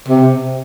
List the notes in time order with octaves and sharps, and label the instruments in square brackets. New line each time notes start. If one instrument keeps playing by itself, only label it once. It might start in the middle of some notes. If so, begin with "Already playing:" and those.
[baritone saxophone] C3